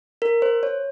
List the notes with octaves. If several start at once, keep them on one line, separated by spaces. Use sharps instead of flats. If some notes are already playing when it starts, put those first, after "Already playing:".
A#4
C5
C#5